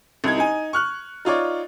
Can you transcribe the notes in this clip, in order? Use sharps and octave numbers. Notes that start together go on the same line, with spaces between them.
C2 D#4 G#6
D#4 G#5
C#6 F6 F#6
D#4 F4 C#5 D5